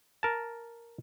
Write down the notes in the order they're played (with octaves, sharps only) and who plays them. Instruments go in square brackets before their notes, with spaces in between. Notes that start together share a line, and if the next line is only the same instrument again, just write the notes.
[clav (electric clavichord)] A#4 A5